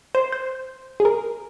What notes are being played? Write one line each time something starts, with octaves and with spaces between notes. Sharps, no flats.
C5
C5
G#4
A#4